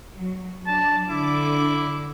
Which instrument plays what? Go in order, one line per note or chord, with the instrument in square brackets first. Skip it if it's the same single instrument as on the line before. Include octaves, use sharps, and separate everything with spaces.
[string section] F#3
[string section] F#3 D4 [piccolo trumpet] A5
[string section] D3 D6 [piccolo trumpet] E4